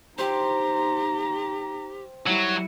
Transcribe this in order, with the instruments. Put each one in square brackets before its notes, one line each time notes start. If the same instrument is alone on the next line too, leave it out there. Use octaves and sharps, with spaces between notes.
[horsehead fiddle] D#4 A#5 [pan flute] G4 [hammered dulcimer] C5 G5
[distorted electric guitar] F#3 [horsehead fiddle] G3 E4